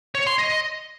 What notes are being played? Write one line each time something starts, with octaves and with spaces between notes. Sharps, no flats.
C#5
C6
D#5